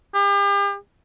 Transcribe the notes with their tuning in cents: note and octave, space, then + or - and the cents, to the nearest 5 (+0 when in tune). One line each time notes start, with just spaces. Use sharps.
G4 +40